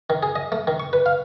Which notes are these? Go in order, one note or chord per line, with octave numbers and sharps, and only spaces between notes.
D#3
G#4
D#5
A3
D#3
C#6
B4
F5